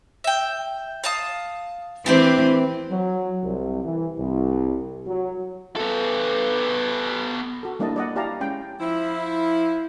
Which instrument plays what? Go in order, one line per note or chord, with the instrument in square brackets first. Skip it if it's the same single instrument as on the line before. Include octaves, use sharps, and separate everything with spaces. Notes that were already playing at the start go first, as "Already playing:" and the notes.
[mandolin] E5 G5
F5 A5 D#6
[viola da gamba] E3 C4 [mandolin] D4 G4 D5
[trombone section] F#3
C2
E3
C2
F#3
[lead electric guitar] B3 A4
[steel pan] F#4 A4
G3 A#3 D4 E4 D#5 A5
D5 D#5 F#5
E4 G4 D5 F5 A5 A#5
G#3 C#4 G5
[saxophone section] F3 E4